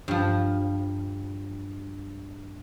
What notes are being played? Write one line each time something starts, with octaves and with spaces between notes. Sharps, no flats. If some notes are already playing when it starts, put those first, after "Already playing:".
G2 F3